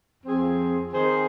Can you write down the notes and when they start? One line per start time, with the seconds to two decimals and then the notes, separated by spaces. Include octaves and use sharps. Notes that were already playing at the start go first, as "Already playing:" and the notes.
0.23 F2 F3 C4 G#4
0.92 D#3 C4 G#4 C5